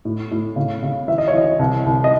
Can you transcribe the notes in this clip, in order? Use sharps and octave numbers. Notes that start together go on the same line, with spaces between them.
A2
A2
C#3
C#3
E3 E5
D#5
C#5
E3 D#5
C2
C2
D#5